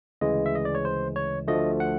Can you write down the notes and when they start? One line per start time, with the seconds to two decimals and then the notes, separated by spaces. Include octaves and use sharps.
0.21 D2 C#3 E3 G#3 D#5
0.46 E5
0.55 D#5
0.65 D5
0.75 C#5
0.85 C5
1.16 C#5
1.48 D2 D3 F3 A3 D#5
1.80 F#5